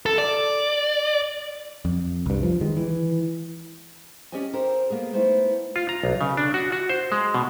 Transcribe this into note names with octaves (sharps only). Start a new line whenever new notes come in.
A4
D5
F2
C2 G2
F3
D#3 G#3
E3
C#4 G4 D5 D#5 G#5
G4 A4 A#4 C5 G5
A#3 B3 G#4
A3 B3 D#4 E4 C5
F4
A#5
B1
C#3
D4
F#4
F#4
C5
G#3
B2